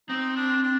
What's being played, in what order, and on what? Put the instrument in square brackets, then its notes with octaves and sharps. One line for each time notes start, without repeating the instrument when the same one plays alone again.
[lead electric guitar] C4 [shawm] D#4
[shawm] D4
D4